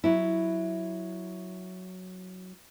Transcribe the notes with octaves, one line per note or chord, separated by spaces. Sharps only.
F#3 E4